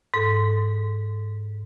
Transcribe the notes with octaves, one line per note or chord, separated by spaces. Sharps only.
G#2 A4